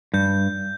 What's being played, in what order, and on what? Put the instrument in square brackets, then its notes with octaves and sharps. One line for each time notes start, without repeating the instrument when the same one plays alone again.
[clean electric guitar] G2 [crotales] G6